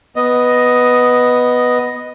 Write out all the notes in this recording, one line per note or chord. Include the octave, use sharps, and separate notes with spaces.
B3 D#5